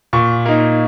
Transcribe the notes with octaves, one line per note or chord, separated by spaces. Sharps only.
A#2 C#6
A#3 D#4